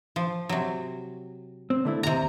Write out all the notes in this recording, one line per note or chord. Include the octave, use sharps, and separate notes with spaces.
F3
C3 F#3
C4
D3 A3 E4
D#2 C3 A#5